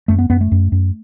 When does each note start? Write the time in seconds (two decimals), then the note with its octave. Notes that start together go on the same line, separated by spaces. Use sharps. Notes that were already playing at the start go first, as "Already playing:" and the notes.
0.08 F#2 A3
0.19 B3
0.30 F#2 B3
0.41 A3
0.52 F#2
0.72 F#2